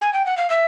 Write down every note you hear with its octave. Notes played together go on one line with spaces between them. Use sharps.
G#5
G5
F#5
F5
E5